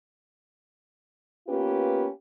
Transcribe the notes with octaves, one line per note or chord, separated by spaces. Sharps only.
A#3 B3 C#4 F4 G4 B4